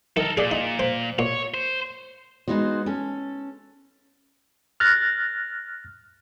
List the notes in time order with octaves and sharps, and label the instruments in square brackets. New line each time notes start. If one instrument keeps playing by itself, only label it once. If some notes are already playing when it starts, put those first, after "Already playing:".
[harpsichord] D#3 [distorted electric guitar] A4 A#4
[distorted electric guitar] A#2 [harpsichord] G#4 D5
[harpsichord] D#4
C5
[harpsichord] A#2 [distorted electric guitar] C#5
[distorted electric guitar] C5
[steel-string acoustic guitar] G#3 B3 D#4 F#4 C5
C#4 A4
[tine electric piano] F6 F#6 A6 A#6